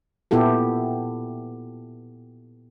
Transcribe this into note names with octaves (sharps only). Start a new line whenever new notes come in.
A#2 B3 E4 G4 A4